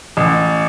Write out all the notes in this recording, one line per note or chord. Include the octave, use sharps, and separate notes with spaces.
A1